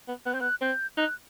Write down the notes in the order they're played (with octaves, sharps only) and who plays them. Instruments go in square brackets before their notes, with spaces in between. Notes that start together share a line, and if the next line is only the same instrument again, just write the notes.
[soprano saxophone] B3
[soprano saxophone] B3 [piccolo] F#6
[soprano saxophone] C4 [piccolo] G6
[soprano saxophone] B3 [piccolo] F#6
[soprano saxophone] C4 [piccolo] G6
[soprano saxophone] D#4 [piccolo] F#6